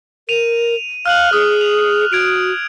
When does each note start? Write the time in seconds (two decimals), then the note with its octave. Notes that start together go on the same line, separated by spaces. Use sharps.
0.29 A#4 D#7 F7
1.06 F5 F6 F#6 F#7
1.33 G#4 D#6
1.61 F7
2.12 F#4 G#6 D7 F7